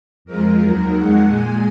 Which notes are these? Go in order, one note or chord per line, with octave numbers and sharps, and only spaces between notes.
F2 F3 G#3 A#4
D#2 D#3 F#3
F2 D#3 G#3 F#5
A#2 G#3 G#5